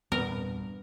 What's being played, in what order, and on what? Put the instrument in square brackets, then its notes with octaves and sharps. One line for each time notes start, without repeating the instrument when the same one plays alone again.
[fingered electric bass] E1 A#2 C4 [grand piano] G2 [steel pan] B3 [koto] A#4